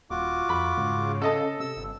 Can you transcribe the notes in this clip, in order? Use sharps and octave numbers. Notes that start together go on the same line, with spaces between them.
D#1 F4 F#4 D6
F2 B5
G#2 C#3
C#4 A4 D#5 A5
C3 E6
G1